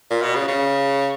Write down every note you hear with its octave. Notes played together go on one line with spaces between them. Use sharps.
A#2
B2
C#3
C#3